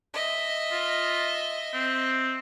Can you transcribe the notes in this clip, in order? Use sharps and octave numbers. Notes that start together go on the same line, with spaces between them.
D#5 E5
F4
C4